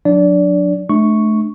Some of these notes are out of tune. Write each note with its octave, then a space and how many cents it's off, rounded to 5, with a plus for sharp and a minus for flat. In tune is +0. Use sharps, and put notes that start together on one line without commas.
F#3 -35 D4 +0 D5 -25
A3 -30 D4 +20 C#6 +0